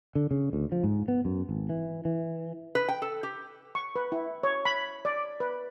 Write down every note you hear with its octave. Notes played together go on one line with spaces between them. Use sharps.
D3
C#3
D2
F3
G#2
B3
F#2
G#1
E3
E3
B4
G5
A4
G4
C#6
B4
E4
C#5
B5
D5
B4